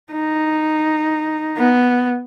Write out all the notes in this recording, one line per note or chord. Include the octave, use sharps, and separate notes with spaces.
D#4
B3